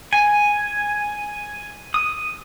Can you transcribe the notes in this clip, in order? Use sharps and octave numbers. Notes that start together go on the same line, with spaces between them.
G#5
D#6